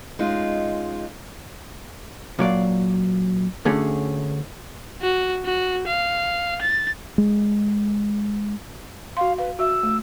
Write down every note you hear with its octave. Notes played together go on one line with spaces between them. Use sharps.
G#3 C#4 D#4 F4
A#2 F#3 D5 F5
D2 D3 A3 C#4 G#4
F#4
F#4
F5
A6
G#3
F#4 F5 C6
B4 F5
F#4 E5 E6
A3